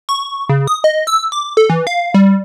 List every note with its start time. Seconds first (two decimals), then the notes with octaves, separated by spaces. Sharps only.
0.09 C#6
0.49 C#3
0.67 D#6
0.84 D#5
1.07 E6
1.32 D6
1.57 A4
1.70 E3
1.87 F5
2.14 G3